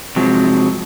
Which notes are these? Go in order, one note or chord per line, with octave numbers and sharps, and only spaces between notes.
C3 F3 F#3 G#3 C4